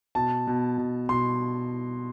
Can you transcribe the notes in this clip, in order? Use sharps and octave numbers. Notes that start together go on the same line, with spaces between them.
B2 A5
B2
B2
B2 C6